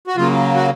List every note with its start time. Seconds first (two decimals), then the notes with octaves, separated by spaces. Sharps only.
0.07 F#4
0.16 C#3 F#3 A#3 F4
0.55 F#4